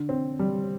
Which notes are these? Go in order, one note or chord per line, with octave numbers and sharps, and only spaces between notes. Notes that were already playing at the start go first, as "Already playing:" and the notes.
Already playing: D3
C4
G3